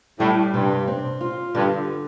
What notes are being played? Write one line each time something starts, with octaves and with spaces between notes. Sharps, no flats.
A2 G3
G2 C3
C4
F4
G2 D3